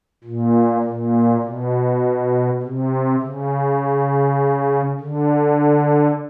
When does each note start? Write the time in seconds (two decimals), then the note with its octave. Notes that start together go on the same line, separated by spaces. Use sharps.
0.24 A#2
0.83 A#2
1.43 B2
2.62 C3
3.21 C#3
5.00 D3